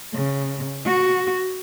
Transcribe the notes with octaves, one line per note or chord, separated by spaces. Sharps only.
C#3
F#4